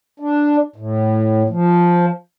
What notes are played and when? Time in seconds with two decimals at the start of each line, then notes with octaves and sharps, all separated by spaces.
0.20 D4
0.76 A2
1.50 F3